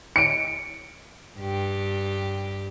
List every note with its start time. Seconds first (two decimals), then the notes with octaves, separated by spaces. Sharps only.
0.16 C#7 D7
1.39 G2 G4